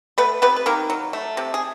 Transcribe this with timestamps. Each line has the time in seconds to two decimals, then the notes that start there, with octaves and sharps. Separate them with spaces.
0.18 A3 B3 B4
0.42 C3 B3 B4
0.56 B4
0.66 D#3 A#3 A#4
0.90 F#3
1.13 A3
1.37 C3
1.54 G#4